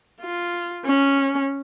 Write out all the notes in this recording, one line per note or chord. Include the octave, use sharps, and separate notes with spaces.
F4
C#4